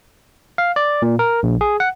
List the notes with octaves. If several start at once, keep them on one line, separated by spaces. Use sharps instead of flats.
F5
D5
A#2
A#4
A#1
G#4
F#5